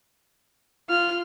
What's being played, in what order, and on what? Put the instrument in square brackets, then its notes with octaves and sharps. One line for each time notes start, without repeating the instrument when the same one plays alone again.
[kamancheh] F4 [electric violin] F6